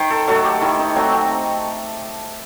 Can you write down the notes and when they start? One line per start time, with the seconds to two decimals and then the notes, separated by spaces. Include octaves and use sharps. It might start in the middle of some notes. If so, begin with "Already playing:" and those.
Already playing: D#3 C5
0.10 A4
0.27 F#3 A3 A4
0.44 G4
0.61 D#3 E4
0.79 D#4
0.96 F#3 A3 C4
1.13 C4